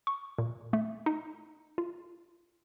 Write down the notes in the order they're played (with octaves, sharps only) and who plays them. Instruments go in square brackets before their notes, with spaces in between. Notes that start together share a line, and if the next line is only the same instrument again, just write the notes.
[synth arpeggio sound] C#6
A#2
A3
D#4
F4